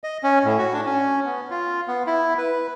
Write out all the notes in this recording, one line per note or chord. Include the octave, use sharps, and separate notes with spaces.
D#5
C#4
A2
F#4
D4
C#4
B3
F4
B3
E4
B4